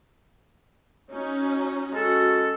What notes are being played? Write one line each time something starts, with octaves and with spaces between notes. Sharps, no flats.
C#4 D#4 F#4
G#3 C#4 F#4 A4